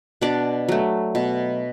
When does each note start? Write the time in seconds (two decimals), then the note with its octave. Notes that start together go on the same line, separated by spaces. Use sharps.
0.21 B2 D4 D5
0.69 F#3 A3
1.15 B2